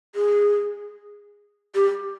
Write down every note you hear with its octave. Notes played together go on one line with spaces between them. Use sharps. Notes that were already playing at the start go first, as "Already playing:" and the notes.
G#4
G4